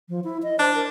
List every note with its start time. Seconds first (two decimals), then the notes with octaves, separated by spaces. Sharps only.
0.09 F3
0.24 E4
0.43 D#5
0.59 D4 C5
0.75 A#4